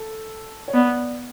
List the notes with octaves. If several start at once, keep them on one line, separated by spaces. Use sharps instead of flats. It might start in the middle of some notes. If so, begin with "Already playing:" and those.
Already playing: A4
C#5
B3 D5